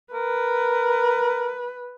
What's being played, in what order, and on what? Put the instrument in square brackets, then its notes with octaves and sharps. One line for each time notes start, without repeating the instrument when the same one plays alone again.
[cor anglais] A#4 [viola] B4